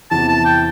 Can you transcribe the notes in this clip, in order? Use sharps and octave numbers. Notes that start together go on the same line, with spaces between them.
E2 C3 E3 A5
A5
G5